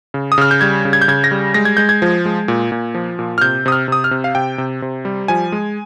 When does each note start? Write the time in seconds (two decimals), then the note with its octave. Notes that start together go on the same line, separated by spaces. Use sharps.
0.14 C#3
0.32 D#6
0.38 C#3 F6
0.51 G6
0.61 G3 G#6
0.85 C#3
0.93 G#6
1.02 G6
1.08 C#3 G#6
1.24 A#6
1.31 G3
1.54 G#3 A#6
1.65 G#6
1.77 G#3 G6
1.89 G#6
2.02 F3
2.25 G#3
2.48 A#2
2.72 A#2
2.94 F3
3.19 A#2
3.38 F6
3.42 C3 G6
3.66 C3 D#6
3.72 F6
3.88 C3 D#6
4.04 F6
4.11 C3
4.24 F5
4.35 C3 G5
4.58 C3
4.82 C3
5.05 G3
5.28 F3 G#5
5.52 G#3